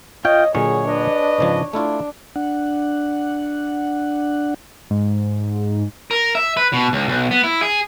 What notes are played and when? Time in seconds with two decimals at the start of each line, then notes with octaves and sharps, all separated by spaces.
0.25 F4 C#5 D#5 G5
0.55 A#2 D3 F#3 G#4 C#5
0.88 D4 B4 D5 D#5
1.38 G#2 C#3 F3
1.73 A3 D4 E4 F4
2.36 D4 F#5
4.90 G#2
6.11 A#4
6.35 E5
6.57 B4
6.73 B2
6.93 C#2
7.08 B1
7.31 B3
7.44 E4
7.62 G#4